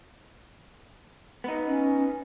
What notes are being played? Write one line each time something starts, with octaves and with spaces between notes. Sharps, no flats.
B3 D#4
C#4